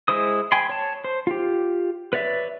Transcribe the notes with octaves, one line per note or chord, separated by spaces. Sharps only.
G#3 E4 C5 D#6
G5 G#5 B5 C6
C#5 A5
C5
F4 G4
B4 C#5 D5 E5